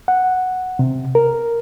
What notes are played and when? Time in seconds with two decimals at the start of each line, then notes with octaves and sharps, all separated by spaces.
0.08 F#5
0.79 C3
1.15 A#4